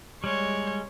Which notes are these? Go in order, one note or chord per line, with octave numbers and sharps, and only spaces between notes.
G3 G#3 C#5